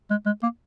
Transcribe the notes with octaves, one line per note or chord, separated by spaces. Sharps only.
G#3
G#3
A#3